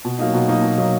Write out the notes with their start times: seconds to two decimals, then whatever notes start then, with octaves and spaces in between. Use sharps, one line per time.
0.05 B2
0.19 F#3 A#3 D#4
0.34 B2
0.48 F#3 A#3 D#4
0.62 B2
0.78 F#3 A#3 D#4